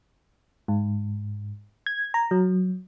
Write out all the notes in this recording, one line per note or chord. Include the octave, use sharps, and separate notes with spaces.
G#2
G#6
A#5
F#3